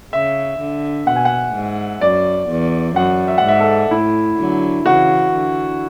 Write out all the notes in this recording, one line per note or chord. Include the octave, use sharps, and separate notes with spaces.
C#3 E5
D3
B2 F#5
G#5
F#5
G#2
F#2 D5
E2
F#2 F#5
E5
F#5
G#2 E5
A4
A2 E4
D3 F#3
C#3 E3 F#4
D3